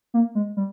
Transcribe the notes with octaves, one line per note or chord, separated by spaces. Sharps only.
A#3
G#3
G3